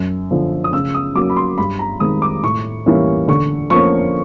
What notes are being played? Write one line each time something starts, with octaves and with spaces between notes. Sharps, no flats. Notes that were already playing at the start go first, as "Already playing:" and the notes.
Already playing: F#2
D3 F3
D#6
C#3 E6
D#6
F#3 A#3 C#4 D6
B5
C6
G2 B5
A#5
D#3 G#3 C4 D#6
D6
A2 C#6
E3 G3 A#3 C#4
D3 C#6
F3 A#3 C#4 C#6